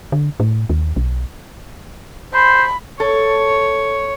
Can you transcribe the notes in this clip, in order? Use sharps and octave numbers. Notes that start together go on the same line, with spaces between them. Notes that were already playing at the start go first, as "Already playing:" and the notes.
D3
A2
D#2
B1
C5 B5
A4 C#5